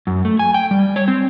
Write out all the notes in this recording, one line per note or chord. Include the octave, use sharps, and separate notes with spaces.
F#2
A3
G#5
G5
G3
C#5
C4